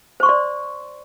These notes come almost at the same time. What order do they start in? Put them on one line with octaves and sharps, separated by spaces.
C5 C#6 C6 D5